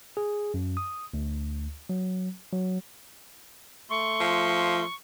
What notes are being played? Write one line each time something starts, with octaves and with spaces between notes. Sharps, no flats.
G#4
F#2
D#6
D2
F#3
F#3
A3 C6 C#6
F3